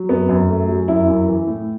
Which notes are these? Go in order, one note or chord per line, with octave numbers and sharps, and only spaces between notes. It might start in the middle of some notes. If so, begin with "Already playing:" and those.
Already playing: F#3
F#2 B3
F#2
A3
F#3
F#2 E4
F#2
E3
A2